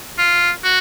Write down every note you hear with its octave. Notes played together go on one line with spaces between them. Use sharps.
F4
F#4